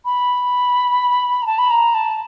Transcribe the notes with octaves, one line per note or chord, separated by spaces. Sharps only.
B5
A#5
A5
B5
A#5
A5